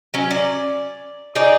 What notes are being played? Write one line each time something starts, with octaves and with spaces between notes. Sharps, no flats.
F#3 C#4
D5
D#4 G#4 C#5 D5